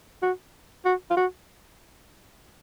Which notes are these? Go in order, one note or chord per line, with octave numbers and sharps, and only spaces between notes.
F#4
F#4
F4
F#4